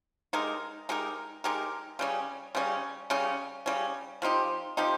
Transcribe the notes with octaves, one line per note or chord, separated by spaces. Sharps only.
G#3 D#4 G4 A#4
G#3 D#4 G4 A#4
G#3 D#4 G4 A#4
C#3 G3 C#4
C#3 G3 C#4
C#3 G3 C#4
C#3 G3 C#4
F3 C4 D#4 G4
F3 C4 D#4 G4